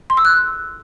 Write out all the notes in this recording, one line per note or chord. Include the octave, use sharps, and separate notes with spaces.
C6
E6
F#6